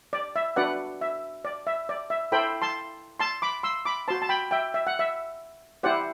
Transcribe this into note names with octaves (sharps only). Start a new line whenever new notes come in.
D5
E5
D4 F#4 B4 D5 F#5
E5
D5
E5
D5
E5
E4 A4 C5 G5 B5
A5 C6
A5 C6
B5 D6
C6 E6
B5 D6
F#4 C5 A5 C6
A5
G5 B5
E5 G5
E5
F#5
E5
E4 G4 C5 D5 F#5